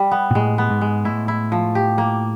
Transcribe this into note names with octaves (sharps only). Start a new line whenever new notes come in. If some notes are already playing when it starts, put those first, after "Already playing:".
Already playing: G3
B3
A#2
A2 G#3
B3
G#2
G#3
A2 E4
E4
F3
G4
A#3